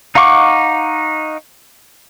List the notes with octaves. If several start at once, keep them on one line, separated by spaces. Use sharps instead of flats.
D#4 F5 F#5 C#6 D6